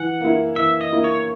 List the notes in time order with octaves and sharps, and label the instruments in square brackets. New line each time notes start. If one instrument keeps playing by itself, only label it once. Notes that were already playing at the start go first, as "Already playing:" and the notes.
Already playing: [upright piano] E3 [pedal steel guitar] F#5
[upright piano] A#3 E4
[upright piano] E3 [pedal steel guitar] E5
[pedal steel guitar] D#5
[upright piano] A#3 E4
[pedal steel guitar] C#5